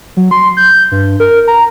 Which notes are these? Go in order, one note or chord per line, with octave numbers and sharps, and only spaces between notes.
F#3
C6
G6
G2
A#4
A#5